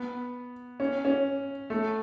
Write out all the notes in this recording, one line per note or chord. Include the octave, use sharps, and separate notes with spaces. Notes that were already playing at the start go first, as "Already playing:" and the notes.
Already playing: B3
C#4
C#4
A3